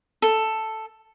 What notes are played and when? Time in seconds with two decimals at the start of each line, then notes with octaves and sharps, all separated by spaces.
0.22 A4